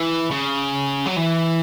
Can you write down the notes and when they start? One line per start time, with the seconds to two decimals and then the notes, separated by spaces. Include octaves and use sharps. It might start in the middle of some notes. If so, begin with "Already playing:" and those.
Already playing: E3
0.31 C#3
1.06 F#3
1.16 E3